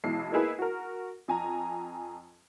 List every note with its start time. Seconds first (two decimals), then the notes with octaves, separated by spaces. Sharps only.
0.04 B1 E3 G#3 E4 C7
0.32 A#3 D#4 E4 G#4 B4
0.59 F#4 A#4
1.28 F2 G#5 A#5